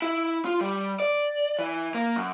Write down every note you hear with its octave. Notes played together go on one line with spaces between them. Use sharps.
E4
F4
G3
D5
E3
A#3
F#2